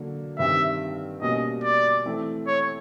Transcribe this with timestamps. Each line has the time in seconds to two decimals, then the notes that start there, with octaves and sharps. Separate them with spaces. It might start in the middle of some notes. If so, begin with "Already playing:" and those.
Already playing: D3 F#3 A#3
0.38 G2 D#3 G3 C4 E5
1.22 B2 G3 A#3 C#4 D#5
1.64 D5
2.06 E3 A3 C4 E4
2.47 C#5